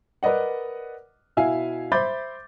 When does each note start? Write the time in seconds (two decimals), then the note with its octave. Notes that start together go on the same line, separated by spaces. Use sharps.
0.23 A#4 B4 D5 D#5 F#5
1.37 B2 E4 E5 F5 G#5
1.92 C5 E5 B5 D6 G6 A6